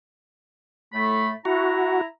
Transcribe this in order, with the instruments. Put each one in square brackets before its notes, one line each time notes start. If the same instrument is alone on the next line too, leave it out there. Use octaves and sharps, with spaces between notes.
[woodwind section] A2 A3 B5
[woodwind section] E4 A#5 [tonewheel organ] F#4